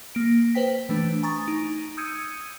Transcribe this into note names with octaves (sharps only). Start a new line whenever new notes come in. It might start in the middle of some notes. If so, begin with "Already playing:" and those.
A#3 D7
B4 C5 G5 B6
E3 A3 D4
G#5 A#5 C#6 D#6 A6
D#4 D7
D#6 E6 G6 G#6 C#7 D#7